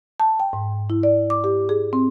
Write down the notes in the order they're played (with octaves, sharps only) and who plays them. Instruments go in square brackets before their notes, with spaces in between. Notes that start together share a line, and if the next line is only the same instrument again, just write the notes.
[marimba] A5
G5
G#2
E4
D5
D6
G4
G#4
C4